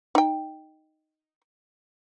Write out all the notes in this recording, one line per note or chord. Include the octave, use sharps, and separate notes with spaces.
D#4 G5